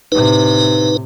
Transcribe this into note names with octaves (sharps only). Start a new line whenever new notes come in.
A2 C3 D#4 B4